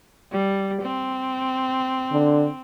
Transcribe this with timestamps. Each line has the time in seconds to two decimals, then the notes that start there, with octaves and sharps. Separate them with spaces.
0.32 G3
0.82 C4
2.12 D3